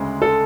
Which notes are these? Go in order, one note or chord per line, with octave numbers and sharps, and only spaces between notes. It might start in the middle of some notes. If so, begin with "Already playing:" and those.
Already playing: D2 C#3 G#3
A4